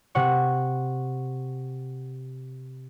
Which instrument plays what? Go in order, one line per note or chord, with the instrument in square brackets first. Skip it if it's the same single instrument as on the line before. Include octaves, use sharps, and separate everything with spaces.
[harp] C3 F#5 C#6